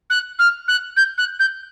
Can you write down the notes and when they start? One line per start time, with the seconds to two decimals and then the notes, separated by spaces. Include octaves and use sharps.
0.10 F#6
0.39 F6
0.68 F#6
0.97 G6
1.18 F#6
1.39 G6